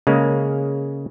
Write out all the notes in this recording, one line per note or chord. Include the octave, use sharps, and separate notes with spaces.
C#3 G#3 A#3 C#4